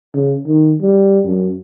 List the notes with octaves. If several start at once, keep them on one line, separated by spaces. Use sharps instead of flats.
C#3
D#3
G3
F#2